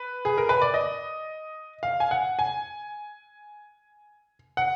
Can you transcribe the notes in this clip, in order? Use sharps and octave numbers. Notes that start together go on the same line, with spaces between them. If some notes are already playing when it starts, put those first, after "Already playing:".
Already playing: B4
G#4
A#4
B4
D5
D#5
F5
G#5
F#5
G#5
F#5